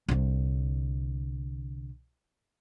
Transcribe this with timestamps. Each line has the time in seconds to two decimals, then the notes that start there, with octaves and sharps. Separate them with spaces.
0.08 C2 D3